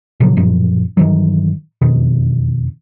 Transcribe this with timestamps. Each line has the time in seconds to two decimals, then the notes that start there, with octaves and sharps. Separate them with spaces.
0.20 A#2 C#3 F3 F#3
0.36 A1 F#2 A#2 F3
0.97 G2 D#3 E3 F#3
1.82 E1 F2 B2 D#3